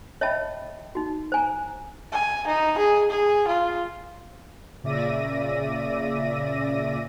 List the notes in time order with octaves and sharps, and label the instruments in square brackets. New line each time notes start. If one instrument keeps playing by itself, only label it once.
[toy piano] C#5 D#5 E5 G5 A5 B5
D#4 F#4
C5 G#5 A#5
[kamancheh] G#5
D#4
G#4
G#4
F4
[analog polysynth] A#2 C#3 D5 E5 A#6 D#7